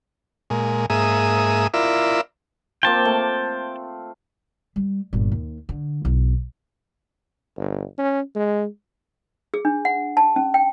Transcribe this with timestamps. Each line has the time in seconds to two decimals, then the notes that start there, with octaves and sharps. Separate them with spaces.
0.50 A#2 G#3
0.90 G#2 A#3 G#4 E5 D#6
1.74 E4 F4 A#4 D5 E5
2.83 A#3 C4 F4 G5 A5
3.05 A3
4.76 G3
5.13 G1 A#2
5.32 D#2
5.69 D3
6.05 B1 E4
7.57 G1
7.98 C#4
8.35 G#3
9.54 G#4
9.65 D4
9.85 F#5
10.17 A5
10.36 C#4
10.54 G5